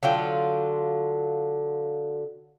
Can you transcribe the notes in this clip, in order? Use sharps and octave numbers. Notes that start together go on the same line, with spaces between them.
D3 F#3 F4 G5